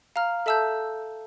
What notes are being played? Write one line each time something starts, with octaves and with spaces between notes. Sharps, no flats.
F5 A#5 F6
A4 E5 A5 E6 G6